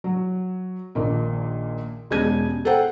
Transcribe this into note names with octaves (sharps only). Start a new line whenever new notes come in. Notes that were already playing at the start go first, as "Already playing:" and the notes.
F#3
A#1 A#2 D#3
E1 G#3 C#4 G4 G#6 D#7
A4 C5 F#5 G5